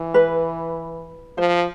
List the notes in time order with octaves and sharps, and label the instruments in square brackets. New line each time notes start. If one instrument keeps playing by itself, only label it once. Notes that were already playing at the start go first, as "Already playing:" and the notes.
Already playing: [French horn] E3
[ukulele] B4
[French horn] F3 [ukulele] C5